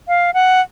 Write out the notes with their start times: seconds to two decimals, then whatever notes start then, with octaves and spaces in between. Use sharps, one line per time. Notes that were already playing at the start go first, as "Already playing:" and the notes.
0.08 F5
0.34 F#5